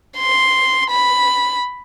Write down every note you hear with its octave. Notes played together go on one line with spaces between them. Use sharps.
C6
B5